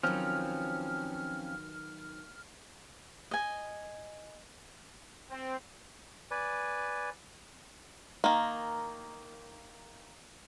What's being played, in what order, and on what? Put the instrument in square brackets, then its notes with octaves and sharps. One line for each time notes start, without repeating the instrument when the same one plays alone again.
[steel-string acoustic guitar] D#3 F#3 B4 [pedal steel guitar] F3 C4 C#4 [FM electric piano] F6
[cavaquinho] D#5 G#5
[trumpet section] C4
[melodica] B4 D5 G#5
[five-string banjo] D#3 A#3